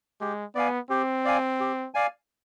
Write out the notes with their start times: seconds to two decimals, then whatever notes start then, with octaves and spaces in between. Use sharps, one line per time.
0.20 G#3 G4
0.55 B3 D5 F5 G#5
0.90 C4 G4
1.25 D5 F5 G#5
1.60 G4
1.94 D5 F5 G#5